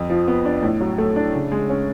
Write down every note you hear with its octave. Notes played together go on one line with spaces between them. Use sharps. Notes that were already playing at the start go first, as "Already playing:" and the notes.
Already playing: F2
F3
B3
D4
A2
F#3
A3
D4
C#3
G#3
C#4